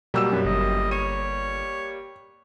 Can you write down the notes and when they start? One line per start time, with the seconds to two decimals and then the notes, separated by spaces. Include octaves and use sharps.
0.14 B2 F#3 G3 A#3 E6 E7
0.32 F#2 B4
0.45 G1 D#5
0.91 C#5 D#7